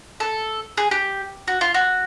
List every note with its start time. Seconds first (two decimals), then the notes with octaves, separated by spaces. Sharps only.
0.20 A4
0.77 G#4
0.91 G4
1.48 F#4
1.61 F4
1.74 F#4